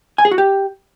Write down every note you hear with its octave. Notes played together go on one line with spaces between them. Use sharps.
G#5
G#4
F#4
G4